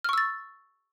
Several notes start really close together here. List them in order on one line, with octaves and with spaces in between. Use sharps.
F6 C#6 E6 A6